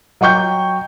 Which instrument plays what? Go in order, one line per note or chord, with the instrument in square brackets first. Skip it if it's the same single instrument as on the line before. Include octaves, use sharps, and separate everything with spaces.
[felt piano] F#3 D#5 G5 C#6 G6